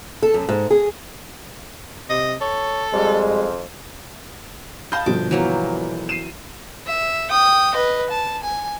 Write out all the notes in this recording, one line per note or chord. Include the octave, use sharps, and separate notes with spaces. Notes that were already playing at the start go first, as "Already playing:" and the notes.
A4
F#2
G#2
G#4
C3 D#5
A4 C#5
F2 G3 G#3
D#5 F5 A5 B5 G6
G1 B2 F3 D6
E3 F#3 A#3
C7 D#7 E7
E5
G5 D#6
B4 D#5
A5
G#5